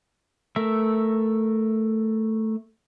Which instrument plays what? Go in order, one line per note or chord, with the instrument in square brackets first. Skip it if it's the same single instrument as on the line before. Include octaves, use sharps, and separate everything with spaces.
[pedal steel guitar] A3 A#4 E5